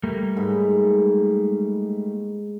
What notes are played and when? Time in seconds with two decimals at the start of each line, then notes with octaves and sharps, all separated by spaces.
0.03 G3 A3 A#3
0.37 G#2 B5